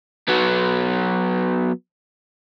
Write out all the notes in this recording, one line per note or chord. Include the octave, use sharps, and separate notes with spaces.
F#3 B3